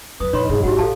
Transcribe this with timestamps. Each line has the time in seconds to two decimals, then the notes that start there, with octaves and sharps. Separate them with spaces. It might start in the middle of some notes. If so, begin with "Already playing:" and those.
0.20 E2 F#3 B4 D#6
0.33 F2 A#2 D#4 C#5 B5 C6
0.49 G2 B2 G#4
0.63 G#1 D4 F#4 G4 F#5
0.79 A1 A4 F5 A5